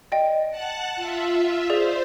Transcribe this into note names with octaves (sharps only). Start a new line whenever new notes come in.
D5 D#5 G5
F#5 A5 F#6
F4 E5
G#4 C5 D5